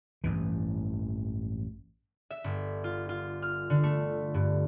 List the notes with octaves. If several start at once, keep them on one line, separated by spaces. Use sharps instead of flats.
A1 G2 E3
E5
G1
F4
F4
F6
D3
A3
G2